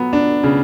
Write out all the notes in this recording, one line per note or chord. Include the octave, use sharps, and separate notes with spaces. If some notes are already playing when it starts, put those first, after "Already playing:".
Already playing: F#3 B3
D4
C#3